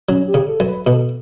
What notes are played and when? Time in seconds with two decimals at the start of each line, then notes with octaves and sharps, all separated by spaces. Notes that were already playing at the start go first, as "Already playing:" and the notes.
0.08 F#3 C#4
0.28 G4
0.34 C#3
0.48 A4
0.60 F#2
0.67 B4
0.86 B2 A4